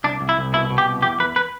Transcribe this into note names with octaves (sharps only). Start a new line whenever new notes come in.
C2 D4
C2
E4
C2
B2 E4
B2
G4
C2
E2 G4
E2 B4
B4